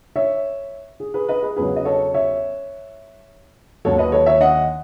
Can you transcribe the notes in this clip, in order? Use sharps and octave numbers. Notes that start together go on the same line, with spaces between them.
C#5 E5
G#4
G#4 B4
B4 D#5
G#4 B4
E2 C#3 F#3 G#4 B4
D#5
A4 C#5
C#5 E5
D#2 D#3 F#3 A4 C#5
B4 D#5
A4 C#5
C#5 E5
D#5 F#5